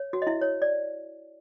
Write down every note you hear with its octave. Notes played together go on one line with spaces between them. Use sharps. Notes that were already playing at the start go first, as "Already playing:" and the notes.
Already playing: C#5
F#4
D#5
E4 E5
C#5
D5